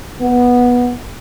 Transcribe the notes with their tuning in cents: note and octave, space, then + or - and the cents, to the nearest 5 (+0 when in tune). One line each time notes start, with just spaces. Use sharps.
B3 -10